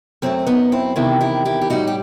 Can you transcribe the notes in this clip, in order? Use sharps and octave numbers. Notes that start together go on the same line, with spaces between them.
F#2 F#3 A3 C4
B3 D#4
C4 E4
E2 C3 D#3 E4 G4
E4 G4
E4 G4
G4
A2 G3 D#4 F#4
G4